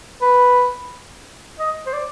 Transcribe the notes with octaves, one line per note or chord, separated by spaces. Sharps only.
B4
D#5
C5
D5